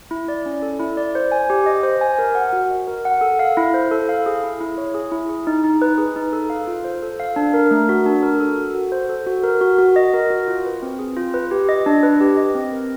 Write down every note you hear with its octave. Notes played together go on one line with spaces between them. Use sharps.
E4
D5
C#4
A4
E4
D5
C5
G#5
G4
D#5
C5
G#5
A#4
F#5
F#4
D#5
A#4
F#5
A4
F5
E4
C5
A4
F5
G#4
E4
E4
C#5
G#4
E4
G#4
D#4
D#4
B4
G#4
D#4
A4
F5
F4
C5
A4
F5
D4
A#4
A3
F#4
D4
A#4
A4
F#4
F#4
C5
A4
F#4
A#4
F#4
F#4
D#5
A#4
F#4
F4
B4
C4
G#4
F4
B4
G4
D#5
D4
B4
G4
D#5
C4
A#4